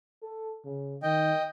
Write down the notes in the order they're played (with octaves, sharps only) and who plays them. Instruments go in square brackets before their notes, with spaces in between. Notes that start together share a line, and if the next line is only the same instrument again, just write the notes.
[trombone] A4
C#3
[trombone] D#3 [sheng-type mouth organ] D#5 G5